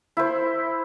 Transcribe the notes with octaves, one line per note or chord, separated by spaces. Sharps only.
E4 C5